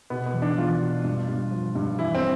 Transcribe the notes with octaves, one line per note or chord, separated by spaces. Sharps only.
B2 B3
B3
E2
D4
E2 F4
B2
G2
G2
F3
G2
E3 E4
C4